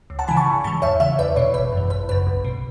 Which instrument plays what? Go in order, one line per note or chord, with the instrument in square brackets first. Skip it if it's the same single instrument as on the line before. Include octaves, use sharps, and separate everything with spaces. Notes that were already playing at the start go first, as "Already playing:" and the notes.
[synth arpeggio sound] C#2
F#5 A5
C#3 E3 G#5 B5
A5 C#6
G#1
G#2 E3 A5 C#6
E2 C#5 E5
C#3 E3 C#5 E5
E2 B4 D5
B2 C#5
G#1 B4
F#2 E3
G#1 B4
F#2 C#3 B4
B1
B2